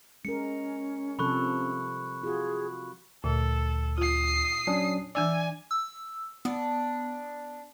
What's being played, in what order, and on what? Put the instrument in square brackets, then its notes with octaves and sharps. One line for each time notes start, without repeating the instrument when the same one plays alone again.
[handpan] G#3 A#4 [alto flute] C#4 [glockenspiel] C#7
[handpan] C3 F3 A4 [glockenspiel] B5 C#6 F#6
[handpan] F4 F#4 [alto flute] G#4
[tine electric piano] D2 [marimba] A#2 [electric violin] A4
[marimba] F4 [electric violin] D#6 C7
[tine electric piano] F#3 C#4 D4
[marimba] E3 D4 E6 [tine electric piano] D5 [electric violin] G#5
[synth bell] E6
[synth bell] B3 [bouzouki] D4